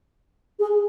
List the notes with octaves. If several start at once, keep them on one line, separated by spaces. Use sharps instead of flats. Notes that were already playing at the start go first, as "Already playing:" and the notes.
G#4